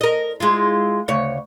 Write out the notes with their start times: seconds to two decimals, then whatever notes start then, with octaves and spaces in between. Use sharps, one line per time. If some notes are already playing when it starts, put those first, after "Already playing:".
0.01 A#4 D#5
0.40 G#3 E4 F4
1.08 D2 C#3 C#5